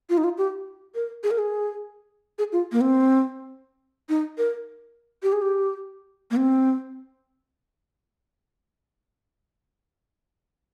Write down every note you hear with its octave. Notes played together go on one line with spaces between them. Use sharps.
F4
D#4
F4
G4
A#4
G#4
A#4
G#4
G#4
F4
A#3
C4
D#4
A#4
G4
G#4
G4
A#3
C4